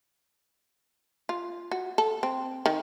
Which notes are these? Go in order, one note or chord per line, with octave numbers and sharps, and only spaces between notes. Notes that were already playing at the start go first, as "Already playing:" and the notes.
F4
F#4
A4
C4
D#3